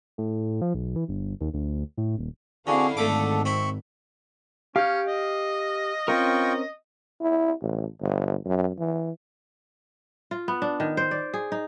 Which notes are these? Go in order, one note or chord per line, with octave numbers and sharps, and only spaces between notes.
A2
F3
B1
E3
G1
D#2
D2
A2
D#1
D3 C4 D4 E4 F#4 G#4 F5
G#1 D3 A3 D4 A4 D6
C4 E4 C#6
C#4 G4 F5 G6
D#5
C4 C#4 F4 A#4 G5 C#6
E4
A1
G1
F#2
E3
F4
B3
D4
D#3
C5
D5
G#4
D#4